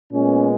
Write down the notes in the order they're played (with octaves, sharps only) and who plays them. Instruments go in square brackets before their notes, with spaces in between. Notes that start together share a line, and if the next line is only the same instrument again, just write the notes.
[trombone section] A#2 G#3 B3 C#4